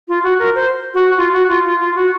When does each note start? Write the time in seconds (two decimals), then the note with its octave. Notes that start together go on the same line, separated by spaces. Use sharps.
0.08 F4
0.24 F#4
0.39 A#4
0.55 C5
0.94 F#4
1.18 F4
1.33 F#4
1.49 F4
1.64 F4
1.80 F4
1.95 F#4